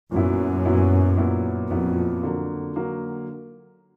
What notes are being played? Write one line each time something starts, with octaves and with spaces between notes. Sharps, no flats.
F#2 A#2 F#3 B3 E4
A#2 F#3 B3 E4
A#2 F#3 B3 E4
F2 A#2 F#3 B3 E4
D3 F#3 A#3
D3 F#3 A#3